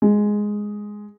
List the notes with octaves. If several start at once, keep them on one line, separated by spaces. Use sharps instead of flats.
G#3